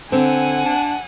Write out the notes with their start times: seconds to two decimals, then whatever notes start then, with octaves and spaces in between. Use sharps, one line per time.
0.12 D3 C4 F#5 G#5
0.65 D4